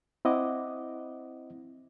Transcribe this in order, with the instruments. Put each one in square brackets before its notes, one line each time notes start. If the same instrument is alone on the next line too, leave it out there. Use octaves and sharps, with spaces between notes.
[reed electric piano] C4 E4 D#5 F#5 D6